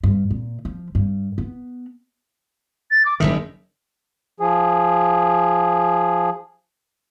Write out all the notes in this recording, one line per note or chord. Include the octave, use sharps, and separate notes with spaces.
G2
A#2
F3
G2
B3
A6
D6
F#1 C2 D#3 E5
F3 G#4